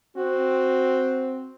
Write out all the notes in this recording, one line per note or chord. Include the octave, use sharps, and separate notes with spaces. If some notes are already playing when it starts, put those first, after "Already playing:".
C4 F#4